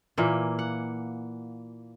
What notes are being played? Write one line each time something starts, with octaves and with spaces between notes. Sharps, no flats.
A#2 E3 A#3
F#5